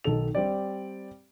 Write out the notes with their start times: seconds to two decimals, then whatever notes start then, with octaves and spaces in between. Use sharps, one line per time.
0.04 B1 D#3 A4 F7
0.35 G3 C4 G4 D5